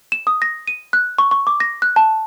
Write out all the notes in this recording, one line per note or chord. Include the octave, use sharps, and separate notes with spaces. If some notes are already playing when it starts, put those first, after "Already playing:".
E7
D#6
A#6
D#7
F#6
C#6
C#6
D6
A#6
F#6
A5